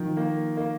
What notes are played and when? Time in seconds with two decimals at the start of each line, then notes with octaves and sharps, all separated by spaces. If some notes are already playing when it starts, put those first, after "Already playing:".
Already playing: D#3 F3
0.17 A#3
0.57 A#3